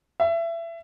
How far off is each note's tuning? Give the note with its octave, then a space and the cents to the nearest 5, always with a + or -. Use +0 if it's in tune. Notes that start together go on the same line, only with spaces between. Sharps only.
E5 +25